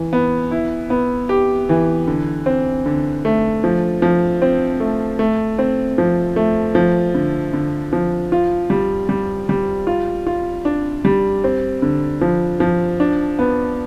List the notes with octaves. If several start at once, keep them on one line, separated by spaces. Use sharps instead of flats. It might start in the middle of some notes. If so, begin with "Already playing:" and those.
Already playing: E3
B3
E4
B3
G4
E3
D3
C4
D3
A3
F3
F3
C4
A3
A3
C4
F3
A3
F3
D3
D3
F3
F4
G3
G3
G3
F4
F4
D4
G3
C4
D3
F3
F3
D4
B3